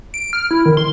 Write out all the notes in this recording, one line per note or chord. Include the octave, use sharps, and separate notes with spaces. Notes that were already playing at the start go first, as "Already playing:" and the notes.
D7
F6
E4
D#3
C6